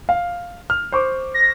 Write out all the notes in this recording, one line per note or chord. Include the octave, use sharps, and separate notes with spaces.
F5
F6
C5 C#6 D6
A#6